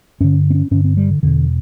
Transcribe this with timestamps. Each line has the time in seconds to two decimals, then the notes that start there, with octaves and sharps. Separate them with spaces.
0.21 G2 D3 C#4
0.50 C4
0.55 C#4
0.71 G2 D3 C#4
0.84 C4
0.97 G3
1.10 D3
1.23 E2 B2 D3